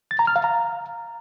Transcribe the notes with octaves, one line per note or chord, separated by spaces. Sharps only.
A6
A#5
F6
F5
A#5